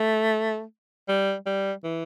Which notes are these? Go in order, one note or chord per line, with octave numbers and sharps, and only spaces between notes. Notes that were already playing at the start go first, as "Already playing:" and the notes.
Already playing: A3
G3
G3
E3